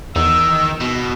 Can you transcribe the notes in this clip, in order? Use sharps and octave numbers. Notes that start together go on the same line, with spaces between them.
E2 D#3 E6
B2